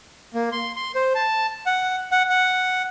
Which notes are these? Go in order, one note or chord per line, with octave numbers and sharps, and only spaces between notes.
A#3
C6
C6
C5
A5
F#5
F#5
F#5